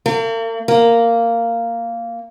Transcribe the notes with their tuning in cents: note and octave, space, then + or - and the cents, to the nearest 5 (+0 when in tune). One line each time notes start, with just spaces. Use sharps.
A#3 -45
A#3 -10